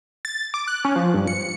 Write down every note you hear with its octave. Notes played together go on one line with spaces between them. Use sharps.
A6
D6
F#6
C#4
F3
G2
C#7